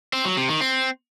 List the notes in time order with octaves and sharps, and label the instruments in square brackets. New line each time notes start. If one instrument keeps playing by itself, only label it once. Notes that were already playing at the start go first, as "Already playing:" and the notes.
[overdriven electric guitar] C4
F#3
C3
D#3
C4